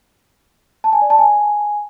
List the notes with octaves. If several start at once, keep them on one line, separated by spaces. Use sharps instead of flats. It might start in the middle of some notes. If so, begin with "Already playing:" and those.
A5
G#5
D5
A5
G#5